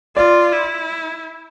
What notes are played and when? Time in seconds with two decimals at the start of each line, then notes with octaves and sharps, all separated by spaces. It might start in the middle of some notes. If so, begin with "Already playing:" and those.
0.16 F4 D5
0.52 E4